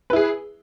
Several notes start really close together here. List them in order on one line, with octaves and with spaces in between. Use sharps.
B4 E4 G#4